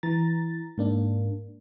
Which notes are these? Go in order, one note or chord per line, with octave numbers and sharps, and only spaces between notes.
E3 A#5 A6
G#2 A#3 D4